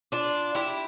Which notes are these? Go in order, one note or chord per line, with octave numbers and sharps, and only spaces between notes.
D4 F4
E4 G4